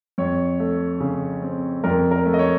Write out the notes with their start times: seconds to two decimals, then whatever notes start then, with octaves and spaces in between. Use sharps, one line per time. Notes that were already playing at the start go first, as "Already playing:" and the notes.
0.18 F2 C#5
0.60 A3
1.00 C#3
1.42 C4
1.84 F2 A#4
2.11 A#4
2.26 A3
2.34 D#5
2.39 C#5